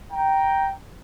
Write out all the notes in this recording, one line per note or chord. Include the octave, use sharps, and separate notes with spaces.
G5 A#5